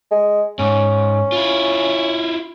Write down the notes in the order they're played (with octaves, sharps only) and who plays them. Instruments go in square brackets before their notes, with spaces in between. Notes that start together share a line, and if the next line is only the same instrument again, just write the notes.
[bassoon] G#3
[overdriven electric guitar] G#2 [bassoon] C#4
[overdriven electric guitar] E4 F4